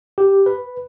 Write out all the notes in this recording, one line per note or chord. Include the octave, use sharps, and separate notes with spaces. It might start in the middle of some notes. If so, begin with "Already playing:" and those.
G4
B4